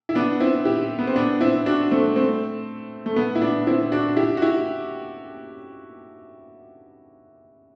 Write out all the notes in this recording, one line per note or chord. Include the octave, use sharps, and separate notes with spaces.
E4
B3 D4
C4 E4
E4 G4
B3
C4
B3 D4
C4 E4
D4 F#4
A3 C4
A3 C4
A3
B3
E4
B3 D4
C4 E4
D4 F#4
E4 G4
F#4
E4 G4